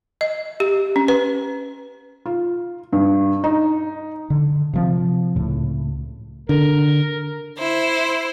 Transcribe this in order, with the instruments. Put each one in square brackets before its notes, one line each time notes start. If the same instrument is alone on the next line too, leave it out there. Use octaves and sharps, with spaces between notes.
[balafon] D#5
G4
C#4
B4
[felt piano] F4
G2
D#4
[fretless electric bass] D3
C3 F3 C4
C#2 A2
[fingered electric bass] D3 [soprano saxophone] A#4
[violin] E4 C5